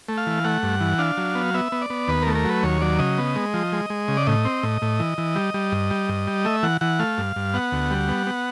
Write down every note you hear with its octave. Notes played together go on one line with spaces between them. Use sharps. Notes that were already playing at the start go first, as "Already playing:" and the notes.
A3
F5
E3
A3 F#5
G2
E3
D4 F5
F#3
B3
B3 E5
B3
D5
B3
D#2 B4
A#4
A3
A#4
F#3 B4
D#2 C#5
F#3 D5
C#3 D#5
B3
G#3
F3
G#3
G#3
C#3
D5
A2 D#5
C4
A2
A2
E3
E3
G3
G3
G2
G3
G2
G3
A3 E5
E3 F#5
E3 F#5
A3 F5
G2
G2
B3 F#5
D2
G3
B3
B3